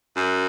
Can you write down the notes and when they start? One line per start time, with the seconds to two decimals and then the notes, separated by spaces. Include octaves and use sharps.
0.17 F#2